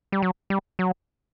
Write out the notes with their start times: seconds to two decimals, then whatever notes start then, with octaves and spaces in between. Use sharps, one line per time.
0.12 G3
0.22 F#3
0.50 G3
0.79 F#3